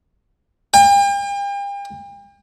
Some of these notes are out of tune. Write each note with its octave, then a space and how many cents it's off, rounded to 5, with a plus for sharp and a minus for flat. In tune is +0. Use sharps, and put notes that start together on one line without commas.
G5 +40